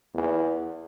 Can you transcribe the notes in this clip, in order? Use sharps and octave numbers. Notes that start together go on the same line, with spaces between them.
E2